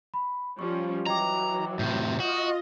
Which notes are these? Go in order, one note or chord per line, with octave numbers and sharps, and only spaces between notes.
B5
F3 G3 C#4 C#6
E3 F#3 D#5 G5 A#5 D6
A2 C3 G6
F4 F#4 D#5